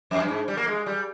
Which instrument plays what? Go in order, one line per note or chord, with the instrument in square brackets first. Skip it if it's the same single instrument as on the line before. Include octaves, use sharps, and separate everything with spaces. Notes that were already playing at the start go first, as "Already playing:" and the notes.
[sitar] F2
G2
G#2
G3
A#3
G#3
G3